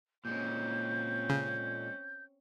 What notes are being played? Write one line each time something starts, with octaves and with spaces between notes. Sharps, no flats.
A#2 G#3 C4 C#4 G6
C#3